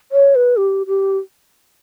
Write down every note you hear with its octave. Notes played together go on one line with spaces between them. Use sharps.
C#5
B4
G4
G4